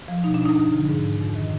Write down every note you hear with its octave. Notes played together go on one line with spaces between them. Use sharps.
F3
B2 D#4
D4
D#4
G2
D3 F3
G#2
D#3
F2
D#3